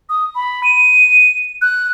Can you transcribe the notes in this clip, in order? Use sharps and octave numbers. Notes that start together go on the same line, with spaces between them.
D#6
B5
D#7
F#6